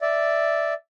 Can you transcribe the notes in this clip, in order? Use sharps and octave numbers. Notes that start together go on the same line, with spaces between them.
D5 E5